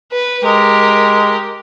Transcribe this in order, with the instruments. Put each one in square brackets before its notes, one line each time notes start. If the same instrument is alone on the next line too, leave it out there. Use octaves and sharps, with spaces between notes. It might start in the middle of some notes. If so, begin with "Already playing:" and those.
[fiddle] B4
[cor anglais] G#3 [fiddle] G4 A#4